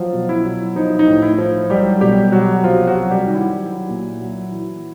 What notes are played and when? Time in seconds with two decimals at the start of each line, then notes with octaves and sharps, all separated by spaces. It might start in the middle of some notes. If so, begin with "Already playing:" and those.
Already playing: F3 F#3 F4
0.13 B2
0.29 E4
0.45 F#3
0.76 F3 D#4
0.99 D#4
1.07 A2
1.22 E4
1.38 F3
1.70 F#3 G3 G4
2.01 B2 G3 G4
2.32 F#3 F#4
2.64 C3 F3 F4
2.87 F#3 F#4
2.95 C3
3.11 G3 G4
3.26 D#3
3.34 E4
3.58 F#3
3.89 A#2
4.21 F#3
4.52 E3